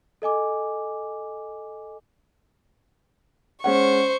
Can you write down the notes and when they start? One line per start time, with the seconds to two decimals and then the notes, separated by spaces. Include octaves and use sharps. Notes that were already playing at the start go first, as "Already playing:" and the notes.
0.22 A4 D#5 G#5 D6
3.64 G#3 C#4 C5 F#5 C#6